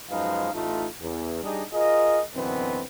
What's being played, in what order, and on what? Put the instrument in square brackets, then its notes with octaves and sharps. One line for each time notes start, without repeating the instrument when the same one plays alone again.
[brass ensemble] F#2 F3 G#3 D#4 B4 F5
A1 A3 D#4 F4
E2
G3 D4 D#4 G#4 D#5
F4 G#4 A#4 D#5
F#2 B2 D3 E3 B3 C4